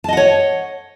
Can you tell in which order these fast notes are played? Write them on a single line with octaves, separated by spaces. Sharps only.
A5 D#5 F#5 C#5